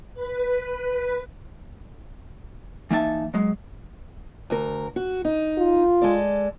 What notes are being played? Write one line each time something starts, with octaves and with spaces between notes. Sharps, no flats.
B4
E3 A#3 D#4 E5 F#5 A5
F#3 G#3
D2 A#4
F#4
D#4
F4
G#3 A4 D5